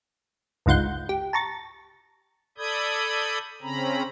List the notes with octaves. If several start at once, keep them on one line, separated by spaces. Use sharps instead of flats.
G1 C#2 G#2 F4 F#5 G6
G4
A5 A#5 C#6 A6
A4 D5 B5 D#6 G6 G#6
C#3 C4 C#4 A#5 B5